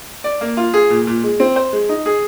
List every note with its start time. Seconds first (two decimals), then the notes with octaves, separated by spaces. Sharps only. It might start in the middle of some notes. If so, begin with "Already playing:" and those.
0.24 D5
0.41 A#3
0.57 F4
0.74 G#4
0.90 A#2
1.07 A#2
1.23 G#3
1.40 C4
1.56 C5
1.73 G#3
1.89 D#4
2.06 G#4